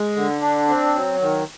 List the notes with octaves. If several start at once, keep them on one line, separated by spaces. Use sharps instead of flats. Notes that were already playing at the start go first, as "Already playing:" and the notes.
Already playing: G#3
D3
D4
C4
F#3
D#3